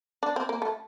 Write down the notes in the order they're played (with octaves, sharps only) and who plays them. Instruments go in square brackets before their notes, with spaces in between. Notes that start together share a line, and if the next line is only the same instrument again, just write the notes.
[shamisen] D4
C4
A#3
A3